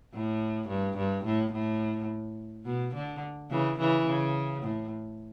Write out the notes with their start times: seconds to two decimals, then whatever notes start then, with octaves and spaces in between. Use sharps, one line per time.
0.13 A2
0.68 G2
0.97 G2
1.24 A2
1.53 A2
2.65 B2
2.94 D3
3.50 C#3 E3
3.79 C#3 E3
4.06 C#3
4.62 A2